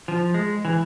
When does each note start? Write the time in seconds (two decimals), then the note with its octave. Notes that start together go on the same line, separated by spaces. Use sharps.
0.08 F3
0.34 G#3
0.65 E3